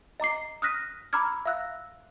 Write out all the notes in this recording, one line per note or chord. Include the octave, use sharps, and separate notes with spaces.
D#5 A#5 D6 C7
D#6 F6 F#6 A#6 B6 D#7
A#5 B5 D6 E6 F6 G#6
E5 F5 E6 F#6 A#6